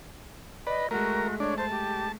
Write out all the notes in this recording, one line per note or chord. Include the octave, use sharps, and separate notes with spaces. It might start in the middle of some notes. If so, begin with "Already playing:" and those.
B4 D5 D#5
G#3 A3 F#4 A#4
D4 C#5
C5 A5
G4